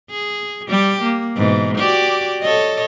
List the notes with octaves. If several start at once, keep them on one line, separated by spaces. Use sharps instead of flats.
G#4
G3 G4
A#3
G#2 B2 E3
F#4 G4 D5
A4 C#5 D#5